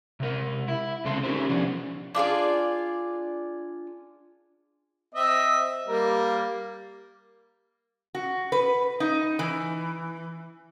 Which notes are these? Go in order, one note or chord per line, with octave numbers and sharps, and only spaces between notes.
C3 A#4
E4
C2 C#3 G#3 C4 A4 C6
C#4 D#4 F4 G4 A#4 C5
C3 F3 B3 C#4 D4
D4 F4 G#4 D5
C4 D#5 E5
G3 A#3 A#4
F#4
B4
D#4
E3